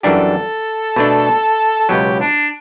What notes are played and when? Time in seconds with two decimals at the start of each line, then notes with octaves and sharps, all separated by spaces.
0.03 F#2 E3 G3 D4 G4 A4
0.96 B2 A3 D4
1.80 A4
1.89 C#2 B2 F#3 G4
2.20 D4